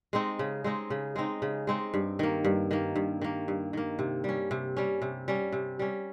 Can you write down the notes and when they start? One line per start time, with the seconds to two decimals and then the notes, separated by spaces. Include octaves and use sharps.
0.13 G#3 C4 D#4
0.39 C#3
0.64 G#3 C4 D#4
0.90 C#3
1.16 G#3 C4 D#4
1.42 C#3
1.67 G#3 C4 D#4
1.94 G2
2.19 D#3 A#3
2.44 G2
2.71 D#3 A#3
2.96 G2
3.22 D#3 A#3
3.48 G2
3.73 D#3 A#3
3.99 C3
4.24 G3 C#4
4.51 C3
4.77 G3 C#4
5.02 C3
5.28 G3 C#4
5.53 C3
5.79 G3 C#4